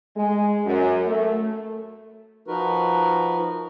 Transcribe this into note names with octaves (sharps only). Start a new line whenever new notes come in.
G#3
F#2
A3
F3 D#4 F#4 A#4 B4